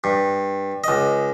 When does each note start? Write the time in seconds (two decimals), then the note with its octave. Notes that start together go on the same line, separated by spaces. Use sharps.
0.04 G2
0.84 C#2 D#5